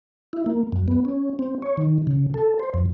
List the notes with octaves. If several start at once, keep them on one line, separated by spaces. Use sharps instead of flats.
E4
A#3
F#2
B3
C#4
C4
C#5
D#3
C#3
A4
C5
F2